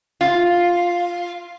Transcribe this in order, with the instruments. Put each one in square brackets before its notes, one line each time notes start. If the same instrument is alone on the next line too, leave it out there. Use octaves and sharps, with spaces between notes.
[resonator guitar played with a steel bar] F4